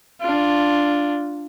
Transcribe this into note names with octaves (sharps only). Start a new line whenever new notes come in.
D4 F4